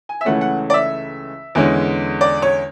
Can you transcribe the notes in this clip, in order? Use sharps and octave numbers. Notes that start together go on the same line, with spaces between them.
G#5
E5
C#2 C#3 E3 A3 C#4 F#5
F#5
D5
E5
E2 D3 G#3 C#4
D5
C#5